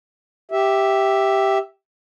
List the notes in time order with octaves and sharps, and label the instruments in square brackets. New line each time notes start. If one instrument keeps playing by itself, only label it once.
[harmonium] G4 E5